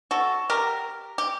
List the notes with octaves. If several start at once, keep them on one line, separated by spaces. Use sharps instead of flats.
F#4 A4
G4 A#4
G4